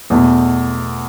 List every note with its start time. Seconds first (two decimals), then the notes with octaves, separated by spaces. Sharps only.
0.10 E2 B2 A3